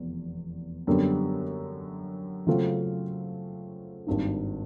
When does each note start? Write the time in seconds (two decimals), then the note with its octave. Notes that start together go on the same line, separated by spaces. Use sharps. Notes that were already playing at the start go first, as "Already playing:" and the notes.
Already playing: F1 E2
0.87 F#2 D3 G3 B3
2.47 C#3 F#3 A3 C4 F4
4.07 G#1 G2 D#3